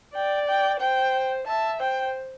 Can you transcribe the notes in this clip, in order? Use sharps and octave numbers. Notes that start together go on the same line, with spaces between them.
D5 G5
G5
C5 G5
E5 A5
C5 G5